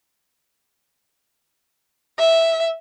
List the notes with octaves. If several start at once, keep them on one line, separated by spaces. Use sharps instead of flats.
E5